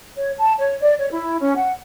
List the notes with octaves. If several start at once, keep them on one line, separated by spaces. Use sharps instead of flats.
C#5
A5
C#5
D5
C#5
E4
C#4
F#5